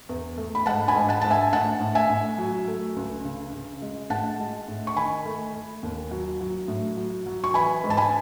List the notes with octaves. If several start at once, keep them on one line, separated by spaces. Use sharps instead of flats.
E2
A3
B5
G#2 F#5 A5
G#5 B5
G#2
F#5 A5
G#2 A5
E5 G#5
A2 F#5 A5
A2
E5 G#5
A2
F#3
A3
C#2
C#3
C#3
G#3
A2 F#5 A5
G#3
A2
C#6
D#3 G#5 B5
A3
A3
D#2
F#3
F#3
A2
F#3
F#3
C#6
E3 G#5 B5
G#2
A5
G#5 B5